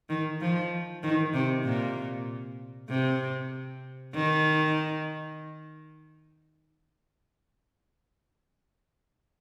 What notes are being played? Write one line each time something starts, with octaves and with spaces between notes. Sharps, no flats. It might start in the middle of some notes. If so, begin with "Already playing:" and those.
D#3
F3
D#3
C3
A#2
C3
D#3